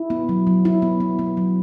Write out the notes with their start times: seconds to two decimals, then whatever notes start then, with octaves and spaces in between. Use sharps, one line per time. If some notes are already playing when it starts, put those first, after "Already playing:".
Already playing: E4
0.10 B3
0.29 F#3
0.47 F#3
0.65 E4
0.82 B3
1.00 B3
1.19 B3
1.37 F#3